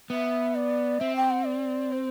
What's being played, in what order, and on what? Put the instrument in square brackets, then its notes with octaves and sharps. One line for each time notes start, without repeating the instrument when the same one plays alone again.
[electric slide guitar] B3 [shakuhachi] E5
[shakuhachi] D5
[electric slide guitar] C4 [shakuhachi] E5
[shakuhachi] G5
F#5
D5
C5